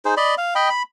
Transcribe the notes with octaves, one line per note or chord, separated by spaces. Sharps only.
D#4 G#4 C5
D5 D#5 B5
F5
D#5 G5 B5
B5